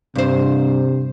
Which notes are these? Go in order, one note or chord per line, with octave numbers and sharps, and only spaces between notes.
G2 C3 C5